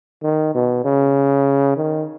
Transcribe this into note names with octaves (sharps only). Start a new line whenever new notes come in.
D#3
B2
C#3
D#3